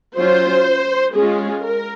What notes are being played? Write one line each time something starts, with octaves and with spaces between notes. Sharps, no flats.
F#3 C#4 F4 C5
G#3 C#4 F4 G#4
A#4